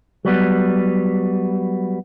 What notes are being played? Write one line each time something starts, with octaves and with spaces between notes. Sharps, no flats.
F#3 G3 B3